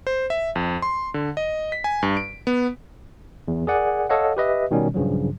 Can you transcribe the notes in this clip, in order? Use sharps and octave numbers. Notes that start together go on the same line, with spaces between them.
C5
E5
F2
C6
D3
D#5
B6
G#5
G2
D7
B3
E2
G#4 A#4 D5 F#5 G#5
A4 C#5 D#5 F5 F#5
G4 B4 D#5 E5
B2 D#3 G3 C#4
A#1 G2 C#3 F3 F#3